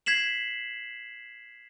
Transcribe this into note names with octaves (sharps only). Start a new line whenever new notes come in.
G#6 B6 C7 E7 F#7